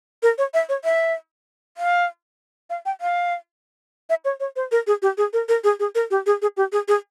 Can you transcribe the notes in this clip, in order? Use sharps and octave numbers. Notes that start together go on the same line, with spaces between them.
A#4
C#5
E5
C#5
E5
F5
F5
G5
F5
E5
C#5
C#5
C5
A#4
G#4
G4
G#4
A#4
A#4
G#4
G#4
A#4
G4
G#4
G#4
G4
G#4
G#4